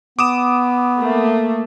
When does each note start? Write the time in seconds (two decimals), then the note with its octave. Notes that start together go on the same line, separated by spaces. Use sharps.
0.19 B3 D6 D#6 E7
0.99 A3 A#3